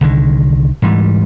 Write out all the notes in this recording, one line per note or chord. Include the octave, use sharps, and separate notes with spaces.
C2 D3 D#3
G#2 E3 G3